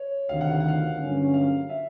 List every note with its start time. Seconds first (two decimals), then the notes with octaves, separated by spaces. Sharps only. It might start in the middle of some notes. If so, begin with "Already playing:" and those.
Already playing: C#5
0.29 D2 C3 D#3 F5
0.41 F#5
0.51 F5
0.60 F#5
0.68 F5
0.98 G2 D3 F#3 A#3 C#4
1.34 F5
1.70 E5